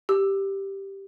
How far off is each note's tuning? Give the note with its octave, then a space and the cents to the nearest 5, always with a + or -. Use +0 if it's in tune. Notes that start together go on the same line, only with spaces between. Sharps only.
G4 +0 E6 +0